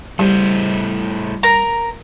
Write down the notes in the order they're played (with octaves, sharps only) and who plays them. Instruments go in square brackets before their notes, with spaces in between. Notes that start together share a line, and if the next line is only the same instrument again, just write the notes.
[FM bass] G3 [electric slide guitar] A3 E4 C5
[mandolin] A#4 A#5